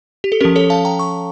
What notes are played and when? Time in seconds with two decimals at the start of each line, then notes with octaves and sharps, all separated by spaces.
0.24 G4
0.32 A4
0.40 F3 C#4 G4 A#4
0.56 A4 C#5
0.70 F5 A5
0.85 G5 A#5
0.99 C#6